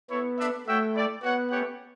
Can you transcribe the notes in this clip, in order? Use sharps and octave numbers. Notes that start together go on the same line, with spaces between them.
B3 E4 A4 C#5
D4 A4 E5
A3 F#4 C#5 E5 G5
E4 A4 D5 G5
B3 F#4 C#5 F#5
A3 C#4 G4 C#5 F#5